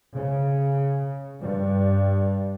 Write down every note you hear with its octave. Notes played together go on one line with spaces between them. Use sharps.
C#3
G2